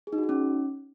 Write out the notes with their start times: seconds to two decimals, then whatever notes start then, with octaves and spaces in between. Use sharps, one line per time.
0.07 G#4
0.13 D#4
0.18 F#4
0.23 D#4
0.29 C#4